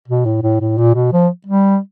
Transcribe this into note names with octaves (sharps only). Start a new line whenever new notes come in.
B2
A2
A2
A2
A#2
B2
F3
G3